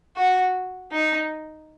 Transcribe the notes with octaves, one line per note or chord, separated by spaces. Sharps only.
F#4
D#4